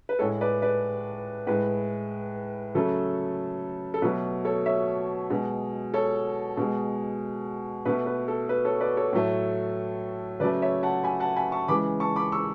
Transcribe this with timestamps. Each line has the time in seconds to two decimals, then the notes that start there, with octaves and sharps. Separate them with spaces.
0.09 B4
0.19 A2 G#3 A4 C#5
0.41 B4 D5
0.62 B4 D5
1.47 A2 G#3 B4
2.75 C#3 F#3 A3 A4
3.94 A4
4.02 B2 F#3 A3 B4
4.45 A4 C#5
4.66 C#5 E5
5.30 B2 G#3
5.94 A4 C#5
6.57 B2 G#3
7.85 B2 A3 B4
8.06 B4
8.28 A4
8.49 B4
8.65 A4 C#5
8.80 B4 D5
8.97 A4 C#5
9.13 A2 F#3 A3
10.40 C#3 F#3 A3 B4 D5
10.62 C#5 E5
10.83 F#5 A5
11.04 G#5 B5
11.20 F#5 A5
11.36 G#5 B5
11.52 A5 C#6
11.68 C#3 E3 G#3 B5 D6
12.00 A5 C#6
12.16 B5 D6
12.32 C#6 E6